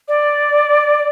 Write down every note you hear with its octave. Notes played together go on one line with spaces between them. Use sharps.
D5